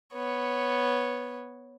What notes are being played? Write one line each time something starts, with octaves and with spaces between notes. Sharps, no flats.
B3 C#5